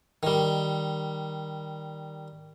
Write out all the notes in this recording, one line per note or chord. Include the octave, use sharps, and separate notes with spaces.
D#3 G3